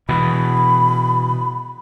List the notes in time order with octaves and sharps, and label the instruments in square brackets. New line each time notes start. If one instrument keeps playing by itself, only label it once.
[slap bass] B2 E3 [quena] B5